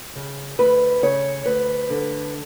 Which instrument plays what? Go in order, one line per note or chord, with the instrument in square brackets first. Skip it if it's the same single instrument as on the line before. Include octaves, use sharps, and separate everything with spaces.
[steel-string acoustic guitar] C#3
D2 B4
C#3 C#5
D2 B4
D3